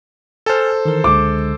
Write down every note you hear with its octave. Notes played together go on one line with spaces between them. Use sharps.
A4 C5 G#5 A5 F6
D#3 E3 A#4
C#2 D3 G#3 D6